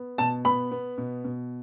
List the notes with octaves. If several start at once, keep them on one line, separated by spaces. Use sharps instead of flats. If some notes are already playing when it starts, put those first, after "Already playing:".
Already playing: B3
B2 A5
B3 B5
B3
B2
B2